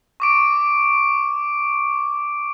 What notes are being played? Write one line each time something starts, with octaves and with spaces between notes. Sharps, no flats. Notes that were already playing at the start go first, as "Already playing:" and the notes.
C#6 D6 D7